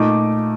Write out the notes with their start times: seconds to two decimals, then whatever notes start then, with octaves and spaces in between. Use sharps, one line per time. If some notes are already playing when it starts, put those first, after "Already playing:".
Already playing: A#2 A3 D#4 D6